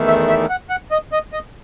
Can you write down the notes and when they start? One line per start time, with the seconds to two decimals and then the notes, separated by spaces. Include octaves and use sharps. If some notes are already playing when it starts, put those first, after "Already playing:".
Already playing: E2 D#3 A3
0.08 E5
0.28 E5
0.50 F#5
0.70 F#5
0.91 D#5
1.12 D#5
1.33 D#5